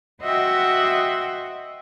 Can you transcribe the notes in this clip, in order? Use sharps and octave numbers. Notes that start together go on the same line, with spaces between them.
F#4 C5 D#5 E5 F#5 G5